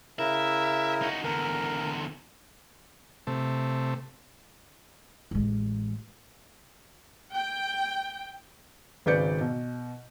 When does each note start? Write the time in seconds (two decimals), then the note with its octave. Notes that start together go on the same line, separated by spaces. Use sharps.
0.19 C#3 E4 A#4 E5
1.02 D#4 F#4
1.24 E2 D3 A#4
3.27 C3 A3
5.31 A1 G#3
7.36 G5
9.06 G#1 C#3 B4 D5 G6 C#7
9.41 B2